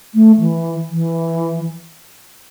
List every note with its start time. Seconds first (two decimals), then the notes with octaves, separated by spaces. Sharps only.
0.14 A3
0.40 E3
0.89 E3